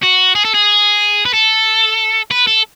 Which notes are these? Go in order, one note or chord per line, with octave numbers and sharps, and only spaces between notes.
F#4
G#4
A4
G#4
B4
A4
B4
A4